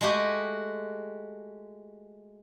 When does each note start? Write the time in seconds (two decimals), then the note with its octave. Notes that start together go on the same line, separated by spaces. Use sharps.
0.01 G#3 A3 F#4 G4 D#5